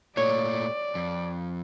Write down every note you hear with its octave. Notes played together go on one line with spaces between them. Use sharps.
A#2 A3 C#5 D5
F2